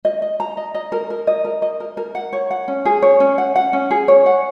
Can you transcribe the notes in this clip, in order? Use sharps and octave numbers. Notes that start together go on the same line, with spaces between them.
D#5
D#5
A#5
D#5
D#5
A#4
A#4
D#5
A#4
D#5
A#4
A#4
F#5
C#5
F#5
C#4
G#4
C#5
C#4
F#5
F#5
C#4
G#4
C#5
F#5